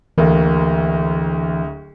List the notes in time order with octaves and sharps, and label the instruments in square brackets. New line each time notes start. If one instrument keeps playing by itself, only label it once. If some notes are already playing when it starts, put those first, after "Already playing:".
[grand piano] D1 D2 A#3 [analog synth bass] E3